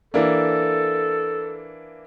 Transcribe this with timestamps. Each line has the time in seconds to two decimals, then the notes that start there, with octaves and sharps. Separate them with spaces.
0.14 E3 A#3 D4 A4